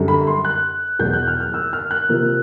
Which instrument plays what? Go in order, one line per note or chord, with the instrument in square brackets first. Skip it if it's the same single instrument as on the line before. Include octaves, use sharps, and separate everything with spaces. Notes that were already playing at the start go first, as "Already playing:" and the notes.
Already playing: [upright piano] F#2 D3 G3
B5
C6
F#6
E2 B2 F#3 B3 G6
F#6
F6
F6
E6
F6
F#6
C3 F3 A#3